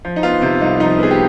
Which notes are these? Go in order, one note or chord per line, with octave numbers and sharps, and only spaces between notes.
F3
D#4
B3 F4
C3
C2 D#4
F3 D#4
B3 G#4
G4